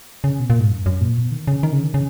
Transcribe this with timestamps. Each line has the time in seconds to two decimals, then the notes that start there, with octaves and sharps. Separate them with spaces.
0.24 C#3
0.40 B2
0.50 A#2
0.60 G#2
0.70 F#2
0.86 F#2
1.01 A#2
1.16 B2
1.31 D#3
1.48 C#3
1.63 D#3
1.73 C#3
1.83 D#3
1.94 C#3